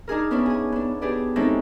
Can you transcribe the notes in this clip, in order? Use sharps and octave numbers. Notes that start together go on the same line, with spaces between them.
D4 D#4 G#4 A#4
B3 C#4 D4 E4
G#4 G#5
B3 D4
D4 G4 G#4 B4 D5
G#3 C4 C#4 D#4 E4 A4